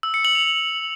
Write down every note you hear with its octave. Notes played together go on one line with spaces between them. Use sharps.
E6
C#7
F#7
F7